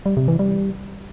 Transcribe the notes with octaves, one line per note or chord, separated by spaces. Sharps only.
G3
C3
E3
G3